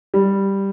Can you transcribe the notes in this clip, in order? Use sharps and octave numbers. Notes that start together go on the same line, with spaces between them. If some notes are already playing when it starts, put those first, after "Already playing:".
G3